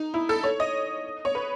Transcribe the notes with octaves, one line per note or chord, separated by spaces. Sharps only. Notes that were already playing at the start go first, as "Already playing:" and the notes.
Already playing: D#4
E4
A4
C#5
D#5
C#5
B4